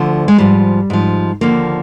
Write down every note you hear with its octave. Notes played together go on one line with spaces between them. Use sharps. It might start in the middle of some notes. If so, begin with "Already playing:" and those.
Already playing: D2 D3 F3
G#3
G#2 F3 G3
G#2 F3
D#2 D3 F3 A#3